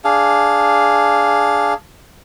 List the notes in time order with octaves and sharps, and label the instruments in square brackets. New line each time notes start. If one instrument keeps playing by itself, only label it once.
[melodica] D4 G#4 F5